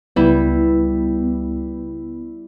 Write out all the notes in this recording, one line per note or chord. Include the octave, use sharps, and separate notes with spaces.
C#2 G3 B3 E4